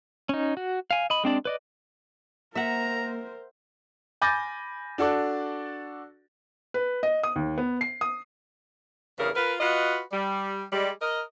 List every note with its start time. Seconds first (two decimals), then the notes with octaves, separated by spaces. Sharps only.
0.29 C#4 D#4
0.57 F#4
0.91 F5 G#5
1.10 D#5 B5
1.24 G#3 C4 D4 D5
1.45 B4 D5 D#5
2.55 A#3 A#4 C5 E5 F#5 A#5
4.22 G#5 B5 D6 G6 A6 A#6
4.98 D4 F#4 A4 D5
6.74 B4
7.03 D#5
7.23 D#6
7.36 D#2
7.58 B3
7.81 C7
8.01 D#6
9.19 E2 G2 C#3 A#4
9.35 F4 A#4 B4
9.61 F4 F#4 B4 D#5
10.12 G3
10.72 G3 G#3
11.01 A#4 D#5